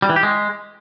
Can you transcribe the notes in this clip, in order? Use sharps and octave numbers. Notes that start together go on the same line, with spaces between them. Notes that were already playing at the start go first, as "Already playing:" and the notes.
G3
E3
G4
G#3